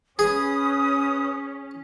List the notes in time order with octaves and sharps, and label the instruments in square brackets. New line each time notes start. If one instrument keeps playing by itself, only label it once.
[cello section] C#4 [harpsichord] G#4 [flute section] B4 D#6